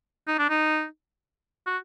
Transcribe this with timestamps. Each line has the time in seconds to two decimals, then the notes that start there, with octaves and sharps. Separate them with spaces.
0.28 D#4
0.38 D4
0.49 D#4
1.66 F#4